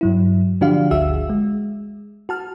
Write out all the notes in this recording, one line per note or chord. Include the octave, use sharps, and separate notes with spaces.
G2 F#3 E4
D3 F3 D4 F#4 G4 F5
G1 D2 F#4 G#4 E5 E6
G#3
F#4 A5 F6